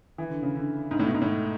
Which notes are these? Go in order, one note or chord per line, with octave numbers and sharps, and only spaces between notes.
E3
D3
C#3
D3
G#2
A2
B2
G#2
A2